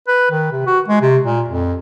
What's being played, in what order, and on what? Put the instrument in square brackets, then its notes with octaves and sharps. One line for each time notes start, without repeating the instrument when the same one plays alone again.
[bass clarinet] B4
D#3
C3
F#4
G#3
C3
A#2
F2